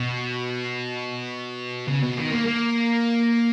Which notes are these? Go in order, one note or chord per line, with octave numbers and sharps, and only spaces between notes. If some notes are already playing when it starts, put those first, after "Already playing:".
Already playing: B2
C#3
B2
D#3
A#3
A#3